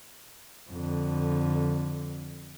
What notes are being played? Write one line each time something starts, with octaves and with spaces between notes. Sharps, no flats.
F2 D3